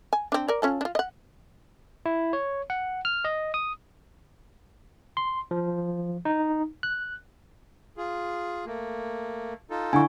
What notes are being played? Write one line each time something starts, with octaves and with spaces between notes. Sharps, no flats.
G#5
C4 D4
A#4 D5
C#4 F4 A4
D4 F4
D#5 F#5
E4
C#5
F#5
F6
D#5
D#6
C6
F3
D#4
F#6
F4 G#4
A3 A#3
D#4 F4 A4
D3 E4 G#5 C#6